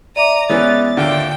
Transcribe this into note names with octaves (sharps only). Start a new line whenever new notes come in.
D5 E5 A#5 D6 D#7
E3 G#3 B3 C#4 B4 A6
D#2 D3 F4 G5 D7